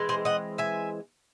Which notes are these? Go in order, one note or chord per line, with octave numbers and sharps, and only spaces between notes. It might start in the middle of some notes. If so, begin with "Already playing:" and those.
Already playing: E3 G#3 C4
G#4 C5
D#5 F#5
E5 G#5